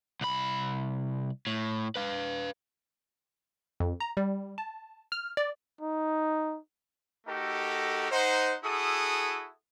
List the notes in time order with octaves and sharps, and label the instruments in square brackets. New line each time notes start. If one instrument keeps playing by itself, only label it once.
[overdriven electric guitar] C2 B5
A2
B4 F5
[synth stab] F2
A#5
G3
A5
F6
D5
[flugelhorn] D#4
[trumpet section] A3 D#4 F#4 G4 A4 A#4
D#4 C5 F#5
E4 F#4 G#4 A4 D#6